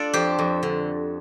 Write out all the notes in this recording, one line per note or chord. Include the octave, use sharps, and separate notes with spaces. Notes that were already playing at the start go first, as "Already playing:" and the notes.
Already playing: D4 F4 A4 D5
F2 G4 C5
F2
D3